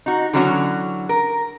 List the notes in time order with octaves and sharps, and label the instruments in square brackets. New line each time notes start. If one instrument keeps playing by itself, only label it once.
[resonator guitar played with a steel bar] D#4 F#4
D3 E3 F#3 C#4 F#4
A#4